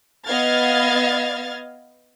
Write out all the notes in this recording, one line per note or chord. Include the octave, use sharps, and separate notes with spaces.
B3 D#5 F5 F6 G#6 A6